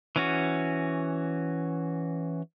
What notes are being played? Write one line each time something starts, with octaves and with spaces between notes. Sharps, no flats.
E3 C#4 F#4